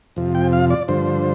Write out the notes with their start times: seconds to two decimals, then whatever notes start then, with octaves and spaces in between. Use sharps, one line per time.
0.16 F2 C3 F3
0.35 G5
0.53 F5
0.70 D5
0.88 G2 D3 F3 C5